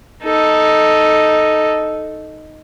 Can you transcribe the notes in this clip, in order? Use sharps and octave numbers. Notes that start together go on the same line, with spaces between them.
D#4 A4